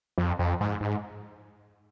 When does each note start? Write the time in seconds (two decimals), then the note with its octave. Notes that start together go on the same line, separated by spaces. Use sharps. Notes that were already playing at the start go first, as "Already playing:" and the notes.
0.18 F2
0.39 F2
0.61 G#2
0.81 G#2